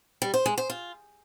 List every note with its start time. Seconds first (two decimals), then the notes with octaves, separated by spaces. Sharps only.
0.22 G3
0.34 C5
0.46 G#3
0.58 C5
0.70 F4